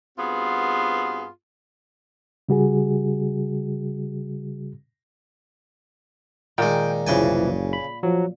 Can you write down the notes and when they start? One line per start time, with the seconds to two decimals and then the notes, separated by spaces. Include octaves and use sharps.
0.18 G2 B3 C4 F4 F#4 G#4
2.49 C#3 G3 F#4 G#4
6.58 A#2 D#3 G#3 G5
7.07 F#1 C2 C#3 E3 F3 G5 G#5
7.73 B5
8.03 F3 F#3